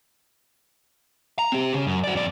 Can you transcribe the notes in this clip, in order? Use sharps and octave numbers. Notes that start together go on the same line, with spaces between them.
A#5
C4 G4
C#3
F#2
F#4 D5
F2 D5